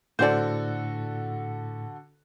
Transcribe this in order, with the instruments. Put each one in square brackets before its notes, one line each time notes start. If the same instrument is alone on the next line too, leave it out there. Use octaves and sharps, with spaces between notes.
[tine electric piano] A2 [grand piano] D3 F#4 A4 [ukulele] C5 D5